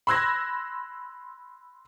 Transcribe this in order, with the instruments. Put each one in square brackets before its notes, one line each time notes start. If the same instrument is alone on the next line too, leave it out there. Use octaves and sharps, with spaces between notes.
[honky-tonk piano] B5 C6 E6 F#6 G#6 A#6